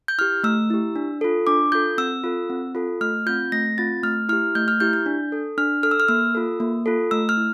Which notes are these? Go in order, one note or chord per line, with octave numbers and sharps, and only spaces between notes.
G6
E4 G4 F6
A3 E6
E4 G4
D4
F4 A4
D4 D6
F4 A4 G6
C4 E6
F4 A4
C4
F4 A4
A3 F6
C4 F4 G6
A3 A#6
C4 F4 A6
A3 F6
E4 G4 F6
A3 G6
F6
E4 G4 G6
G6
D4
A4
D4 F6
A4 F6
E6
F6
A#3 E6
F4 A4
A#3
F4 A4
A3 E6
F6
E4